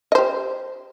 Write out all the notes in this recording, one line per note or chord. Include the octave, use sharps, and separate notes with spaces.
G4 C5 D#5